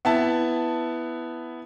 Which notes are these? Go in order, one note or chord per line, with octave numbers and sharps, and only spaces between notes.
B3 E4 A5